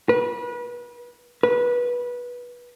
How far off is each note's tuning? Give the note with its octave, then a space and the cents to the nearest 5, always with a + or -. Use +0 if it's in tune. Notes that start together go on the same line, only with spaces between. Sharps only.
B4 -30
B4 -20